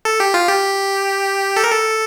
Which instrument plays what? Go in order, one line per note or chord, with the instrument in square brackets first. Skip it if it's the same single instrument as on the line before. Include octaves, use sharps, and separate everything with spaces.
[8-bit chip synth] A4
G4
F4
G4
A4
A#4
A4